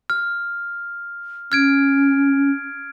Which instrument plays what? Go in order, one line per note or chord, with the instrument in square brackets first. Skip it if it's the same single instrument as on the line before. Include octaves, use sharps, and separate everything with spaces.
[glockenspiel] F6
[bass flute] C#4 [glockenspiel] F6 G#6 D7